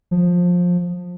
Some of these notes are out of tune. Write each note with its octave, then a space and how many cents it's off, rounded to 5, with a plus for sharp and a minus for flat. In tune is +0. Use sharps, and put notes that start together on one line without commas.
F3 +20